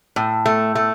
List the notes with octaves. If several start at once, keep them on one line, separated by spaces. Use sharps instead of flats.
A2
A3
A3